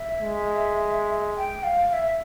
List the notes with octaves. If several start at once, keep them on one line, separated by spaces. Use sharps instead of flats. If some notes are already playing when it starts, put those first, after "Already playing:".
Already playing: E5
G#3
G5
F5
F5
E5